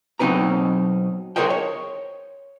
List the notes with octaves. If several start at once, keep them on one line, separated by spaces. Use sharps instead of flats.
B2 F#3 C4 D#4 B4 A#5
G#4 A#4 C5 C#5 D#5 G5
C#5